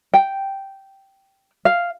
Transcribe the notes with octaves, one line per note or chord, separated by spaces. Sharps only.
G5
F5